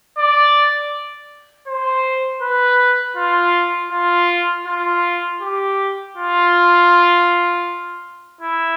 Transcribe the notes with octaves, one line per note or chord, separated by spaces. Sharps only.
D5
C5
B4
F4
F4
F4
G4
F4
E4